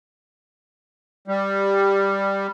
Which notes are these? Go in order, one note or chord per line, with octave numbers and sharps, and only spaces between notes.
G3